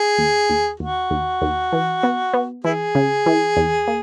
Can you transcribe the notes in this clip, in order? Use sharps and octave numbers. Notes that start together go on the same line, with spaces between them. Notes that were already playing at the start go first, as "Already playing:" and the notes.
Already playing: G#4
D#2
D#2
D#2 F#4
D#2
D#2
E3
B3
B3
E3 E4 G#4
C#3
E3
E2
A#3